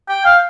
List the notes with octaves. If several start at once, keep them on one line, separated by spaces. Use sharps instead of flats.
G5
F5